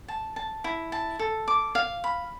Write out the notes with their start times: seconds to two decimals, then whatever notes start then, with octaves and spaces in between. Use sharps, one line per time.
0.08 A5
0.36 A5
0.64 E4
0.92 A5
1.19 A4
1.48 D6
1.75 F5
2.04 B5